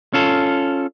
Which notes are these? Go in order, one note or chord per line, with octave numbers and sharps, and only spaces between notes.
C#4 F4 A4